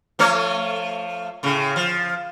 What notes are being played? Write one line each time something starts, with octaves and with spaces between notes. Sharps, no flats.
F3 A3 C#5
A2 C#3
F3